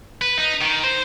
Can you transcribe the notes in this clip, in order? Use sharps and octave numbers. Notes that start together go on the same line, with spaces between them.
B4
D#4
D#3
C5